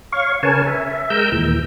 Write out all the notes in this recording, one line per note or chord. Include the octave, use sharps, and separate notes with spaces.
C#5 F5 C#6
C#3 A#4 B4 C#5 G#5 A5
E5
G#3 A#4 G5 A#5 E6 G6
D#2 A#2 E3